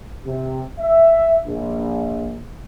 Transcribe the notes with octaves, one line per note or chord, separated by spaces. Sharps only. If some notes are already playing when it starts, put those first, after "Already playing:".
C3
E5
A#1